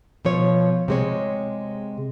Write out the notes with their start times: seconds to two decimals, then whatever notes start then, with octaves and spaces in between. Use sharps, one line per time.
0.25 B2 F3 C#5
0.88 C3 G#3 C#5